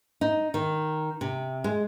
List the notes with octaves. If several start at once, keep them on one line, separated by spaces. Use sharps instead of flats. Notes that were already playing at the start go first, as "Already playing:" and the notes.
D#4
D#3
C3
G#3